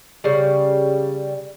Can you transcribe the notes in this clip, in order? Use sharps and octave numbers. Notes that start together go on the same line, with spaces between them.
C#3 G3